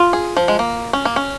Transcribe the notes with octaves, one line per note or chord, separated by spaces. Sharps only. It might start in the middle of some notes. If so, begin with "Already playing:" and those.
Already playing: F4
G#4
F3
G#3
A#3
C#4
A#3
C#4